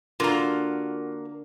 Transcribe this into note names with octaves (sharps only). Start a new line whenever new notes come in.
D3 A#3 F4 F#4 A#5